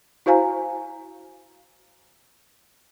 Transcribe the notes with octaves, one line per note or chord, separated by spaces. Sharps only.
E4 F#4 C5 F5 G#5 A#5